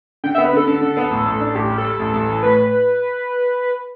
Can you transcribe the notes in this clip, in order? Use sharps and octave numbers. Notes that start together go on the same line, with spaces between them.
D3 G5
B3 E5
B4
D3 A4
D3
D3
B3
A1
A1
D4
A1 G4
G3
A4
G3
A1
A1
E3
A2 B4